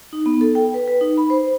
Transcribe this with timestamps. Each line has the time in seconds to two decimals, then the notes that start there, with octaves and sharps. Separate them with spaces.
0.13 D#4
0.26 B3
0.41 A4
0.55 G5
0.74 B4
0.88 B4
1.01 D#4
1.17 B5
1.30 C5